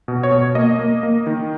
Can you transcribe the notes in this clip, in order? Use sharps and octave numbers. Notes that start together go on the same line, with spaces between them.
B2
C#5
B2
A#3 D#5
A#3
A#3
D#3